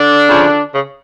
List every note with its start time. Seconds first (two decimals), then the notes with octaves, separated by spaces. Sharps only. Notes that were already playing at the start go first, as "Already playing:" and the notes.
Already playing: D3 D4
0.28 C#3 F3
0.73 C#3